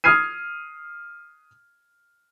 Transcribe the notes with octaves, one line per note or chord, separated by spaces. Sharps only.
D#6 F6 G#6 C7 D#7